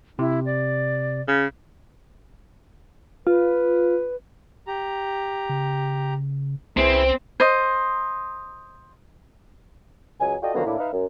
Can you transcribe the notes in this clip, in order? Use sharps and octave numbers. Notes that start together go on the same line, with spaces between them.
C3 E4
D5
C#3
F4 B4
G4 A#5
C#3
C2 C4 E4 G#4 B4
C5 D#5
C#2 F#3 D#5 G#5
F4 F#4 A4 D5 D#5 G5
D3 D#3 F3 F#3 A#3 B3
A2 A#3 D4 E4
D#4 B4 E5 F5
F#2